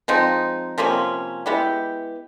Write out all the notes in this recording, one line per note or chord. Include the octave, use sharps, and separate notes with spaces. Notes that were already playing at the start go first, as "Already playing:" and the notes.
F3 G#3 C4 D#4
C3 F3 A#3 C#4
G#3 B3 E4 G4